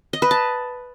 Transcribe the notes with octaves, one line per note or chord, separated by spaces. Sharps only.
D#5
B4
A5